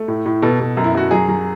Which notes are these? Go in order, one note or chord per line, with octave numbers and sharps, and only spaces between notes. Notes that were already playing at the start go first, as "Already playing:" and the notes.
Already playing: A3
A2
A2
B2 A4
B2
F#2
E4
F#2 F#4
F#3 G#4
F#3